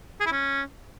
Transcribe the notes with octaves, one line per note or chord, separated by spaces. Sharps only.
G#4
E4
C#4